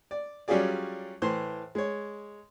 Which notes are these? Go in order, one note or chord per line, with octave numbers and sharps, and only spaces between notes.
D5
F#3 G3 C#4 F4 G#4 D5
A2 E3 C5 C6
G#3 C#5